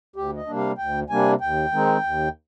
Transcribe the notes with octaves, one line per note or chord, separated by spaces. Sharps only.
D2 G4
D#5
C3 G3 A#3 D4
F5
D2 G5
C3 G3 A#3 D4 G#5
D#2 G5
D#3 G#3 C4 D#4
D#2